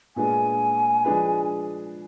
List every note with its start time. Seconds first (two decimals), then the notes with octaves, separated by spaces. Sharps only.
0.16 A#2 G#3 B3 D4 G#4 G#5
1.04 F3 G#3 D4 G#4 B4